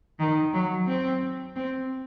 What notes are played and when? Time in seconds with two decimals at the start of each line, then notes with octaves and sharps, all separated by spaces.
0.19 D#3
0.53 F#3
0.87 C4
1.56 C4